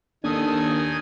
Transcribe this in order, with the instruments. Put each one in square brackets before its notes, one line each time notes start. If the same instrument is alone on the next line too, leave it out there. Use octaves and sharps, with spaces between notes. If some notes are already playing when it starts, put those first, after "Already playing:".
[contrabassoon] D#2 [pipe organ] D#3 G#5 [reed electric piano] D4 [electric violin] A4 D#6